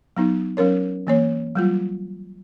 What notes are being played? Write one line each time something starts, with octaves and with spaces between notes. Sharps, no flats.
F#3 B3 D#4
F#3 C#4 A#4 C#5
E3 A#3 C#5
F#3 G3 F4